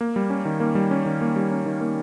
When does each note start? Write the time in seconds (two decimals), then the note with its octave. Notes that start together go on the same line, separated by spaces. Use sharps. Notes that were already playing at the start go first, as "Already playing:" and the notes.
0.01 A#3
0.16 G3
0.30 C#4
0.45 D#3
0.60 A#3
0.75 G3
0.91 C#4
1.06 D#3
1.21 A#3
1.36 G3
1.52 C#4
1.66 D#3
1.81 A#3